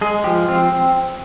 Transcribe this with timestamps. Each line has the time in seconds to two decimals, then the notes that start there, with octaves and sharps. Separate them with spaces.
0.01 G#3 G#4
0.24 F3 G4
0.49 C4 F4